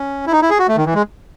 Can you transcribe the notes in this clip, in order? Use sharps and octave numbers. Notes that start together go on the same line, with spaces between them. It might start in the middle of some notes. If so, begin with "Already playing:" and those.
Already playing: C#4
E4
D#4
E4
G#4
F#4
A3
D#3
E3
G#3